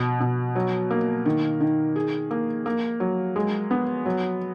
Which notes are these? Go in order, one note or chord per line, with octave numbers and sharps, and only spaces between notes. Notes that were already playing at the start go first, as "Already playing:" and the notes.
Already playing: B2
B2
F#3
A#3
D#3
D#3
G#4
A#3
A#3
F#3
G#3
B3
F#3